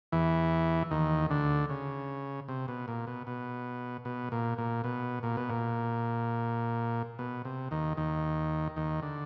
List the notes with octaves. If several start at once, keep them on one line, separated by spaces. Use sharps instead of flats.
E2 E3
D#2 D#3
D2 D3
C#3
C3
B2
A#2
B2
B2
B2
A#2
A#2
B2
A#2
B2
A#2
B2
C3
D#2 D#3
D#2 D#3
D#2 D#3
D3